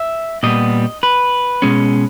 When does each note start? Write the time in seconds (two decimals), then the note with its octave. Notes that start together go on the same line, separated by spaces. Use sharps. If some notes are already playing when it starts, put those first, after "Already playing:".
Already playing: E5
0.43 A#2 G3 B3 D#5
1.03 B4
1.62 B2 G#3 C#4